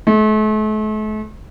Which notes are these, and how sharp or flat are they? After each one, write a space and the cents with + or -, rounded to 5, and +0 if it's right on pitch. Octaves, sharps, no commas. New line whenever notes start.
A3 -40